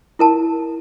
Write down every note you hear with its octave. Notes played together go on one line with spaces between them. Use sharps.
E4 A#4 A5